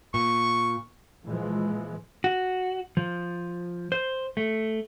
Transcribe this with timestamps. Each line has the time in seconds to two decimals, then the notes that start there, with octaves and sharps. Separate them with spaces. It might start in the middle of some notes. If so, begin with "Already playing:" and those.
0.14 A#2 C#6
1.24 A#2 E3 F3 G#3
2.24 F#4
2.97 F3
3.92 C5
4.37 A3